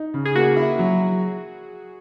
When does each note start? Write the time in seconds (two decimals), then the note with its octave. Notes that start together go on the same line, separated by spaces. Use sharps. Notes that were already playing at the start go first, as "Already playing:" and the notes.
Already playing: D#4
0.14 C#3
0.26 G#4
0.35 A#3 F#4
0.57 E4
0.79 F#3